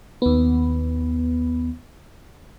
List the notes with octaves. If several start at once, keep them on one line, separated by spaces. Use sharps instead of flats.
D#2 B3